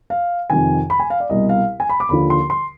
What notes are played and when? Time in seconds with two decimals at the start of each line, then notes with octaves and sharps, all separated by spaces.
0.10 F5
0.50 F2 C3 D#3 G#5
0.90 B5
1.00 G#5
1.10 F5
1.20 D5
1.30 C2 B2 D#5
1.49 F5
1.80 G#5
1.89 B5
2.00 D6
2.09 D#2 D3 F3 B5
2.30 C6
2.50 C6